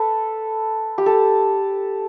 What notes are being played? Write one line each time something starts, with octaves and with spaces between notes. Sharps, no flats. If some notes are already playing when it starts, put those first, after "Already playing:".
Already playing: A4 B4
G4
A4